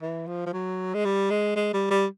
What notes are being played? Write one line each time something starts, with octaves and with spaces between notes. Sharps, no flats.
E3
F3
F3
F#3
G#3
G3
G#3
G#3
G3
G3